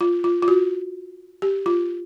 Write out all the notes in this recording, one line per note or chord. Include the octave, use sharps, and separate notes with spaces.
F4
F4
F4
F#4
G4
F4